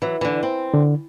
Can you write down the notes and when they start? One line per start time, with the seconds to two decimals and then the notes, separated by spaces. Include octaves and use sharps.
0.02 E3 F#3
0.21 D3 E3
0.43 C4
0.74 D3